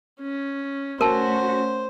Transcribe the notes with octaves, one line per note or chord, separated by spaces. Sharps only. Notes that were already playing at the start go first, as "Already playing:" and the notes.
C#4
A3 C#4 F#4 A#4 C5 A5